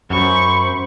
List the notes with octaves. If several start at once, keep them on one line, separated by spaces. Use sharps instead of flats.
F#2 C5 B5 C#6